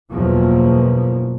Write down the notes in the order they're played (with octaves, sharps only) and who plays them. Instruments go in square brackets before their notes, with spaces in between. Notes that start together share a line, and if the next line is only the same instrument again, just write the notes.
[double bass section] F#1 E2 B2 F3 A#3